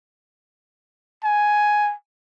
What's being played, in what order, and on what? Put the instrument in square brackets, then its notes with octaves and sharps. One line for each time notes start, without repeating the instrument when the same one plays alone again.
[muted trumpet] G#5